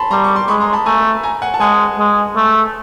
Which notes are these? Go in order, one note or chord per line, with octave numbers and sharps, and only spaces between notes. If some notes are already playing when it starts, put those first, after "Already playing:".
Already playing: A5 B5 C6
G3 A#5 C6
C#6
C6 D6
G#3 B5 C#6
A#5 C6
A5 B5
A3 G#5 A#5
G#5 A#5
F#5 G#5
A5
G#3 F#5 G#5
G#3
A3